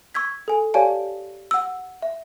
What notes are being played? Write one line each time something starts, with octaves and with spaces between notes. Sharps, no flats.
C#6 E6 G#6 B6
A4 G#5
G4 C#5 D5 F5 G#5 A5
F#5 E6
E5